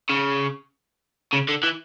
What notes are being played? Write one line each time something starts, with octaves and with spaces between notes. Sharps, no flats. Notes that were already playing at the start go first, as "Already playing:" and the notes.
C#3
C#3
D3
E3